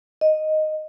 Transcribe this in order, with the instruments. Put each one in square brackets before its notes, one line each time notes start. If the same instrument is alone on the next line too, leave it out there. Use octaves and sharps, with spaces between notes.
[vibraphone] D#5